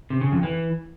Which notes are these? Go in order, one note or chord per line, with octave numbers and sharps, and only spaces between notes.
C3
C#3
F2
E3